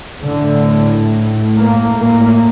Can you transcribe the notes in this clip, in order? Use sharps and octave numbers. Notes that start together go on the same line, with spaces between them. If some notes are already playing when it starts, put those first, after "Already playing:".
A2 D3
A#3
A2 A#3